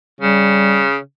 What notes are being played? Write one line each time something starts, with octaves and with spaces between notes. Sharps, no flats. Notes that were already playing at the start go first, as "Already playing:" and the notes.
C#3 G3